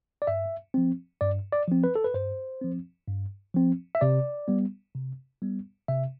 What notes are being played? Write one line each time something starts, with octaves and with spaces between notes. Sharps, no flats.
D5
G2 E5
F3 C4
G2 D5
D5
F3 C4
B4
A4
B4
G2 C5
F3 C4
G2
F3 C4
E5
C3 D5
G3 B3
C3
G3 B3
C3 E5